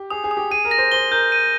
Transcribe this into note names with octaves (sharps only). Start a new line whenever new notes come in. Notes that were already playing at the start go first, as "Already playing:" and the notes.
Already playing: G4
G#4 D#6
G#4
D#6
G4
G#4 D#7
A#4
A#6
C5
C5 G7
A#4 G6
D#7